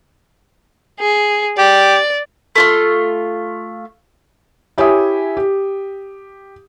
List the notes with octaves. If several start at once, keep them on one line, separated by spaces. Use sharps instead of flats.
G#4
G4 D5
A3 F4 C6
E4 G4 C#5 E5 G#5 D#6
G4